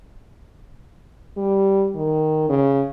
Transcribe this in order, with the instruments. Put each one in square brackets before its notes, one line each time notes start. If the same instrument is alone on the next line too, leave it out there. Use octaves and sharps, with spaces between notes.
[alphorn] G3
D#3
C#3